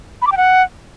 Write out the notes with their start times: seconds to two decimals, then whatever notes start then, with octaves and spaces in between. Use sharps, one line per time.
0.22 B5
0.27 D6
0.32 G5
0.37 F#5